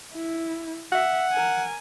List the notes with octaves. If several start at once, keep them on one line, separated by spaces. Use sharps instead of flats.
E4
E5 F#5
A#4 G#5